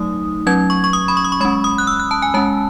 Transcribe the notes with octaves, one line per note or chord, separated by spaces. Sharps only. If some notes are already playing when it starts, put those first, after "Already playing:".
Already playing: F#3 A3 D#4 D#6
F#3 C#4 G#6
C#6
C#6
D#6
B5
C#6
D#6
C#6
G#3 C#4 B5
D#6
F#6
E6
F#6
A5
G#5
G#3 C#4 A5